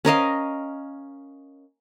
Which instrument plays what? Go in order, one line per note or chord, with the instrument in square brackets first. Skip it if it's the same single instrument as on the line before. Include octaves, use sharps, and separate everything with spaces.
[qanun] C#4 A#4 D#5 F5